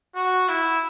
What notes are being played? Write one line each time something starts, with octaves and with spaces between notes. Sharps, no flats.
F#4
E4